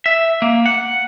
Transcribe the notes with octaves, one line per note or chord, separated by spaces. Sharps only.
E5
A#3
F#5